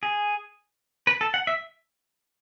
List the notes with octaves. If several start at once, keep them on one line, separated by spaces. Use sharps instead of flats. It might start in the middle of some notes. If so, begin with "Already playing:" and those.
G#4
B4
A4
F#5
E5